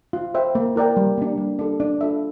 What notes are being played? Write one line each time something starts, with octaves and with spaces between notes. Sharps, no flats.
F4
C5 E5 G5
A#3
E4 A#4 D5 G5
G3
A#3 D4
G3
D4 A4
D4
F4 A4 E5